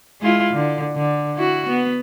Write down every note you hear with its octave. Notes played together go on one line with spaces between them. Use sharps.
G#3 E4 F4
D3
D3
E4 F#4
B3